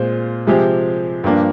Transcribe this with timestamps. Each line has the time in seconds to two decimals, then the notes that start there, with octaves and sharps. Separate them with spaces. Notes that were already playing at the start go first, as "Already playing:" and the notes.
Already playing: A#2 G#3 C4 F4 C5
0.47 C3 F3 G#3 C4 G4
1.24 G2 F3 A#3 D4